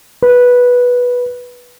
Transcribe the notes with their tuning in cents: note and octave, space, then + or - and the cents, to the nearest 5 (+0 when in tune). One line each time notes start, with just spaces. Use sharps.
B4 -10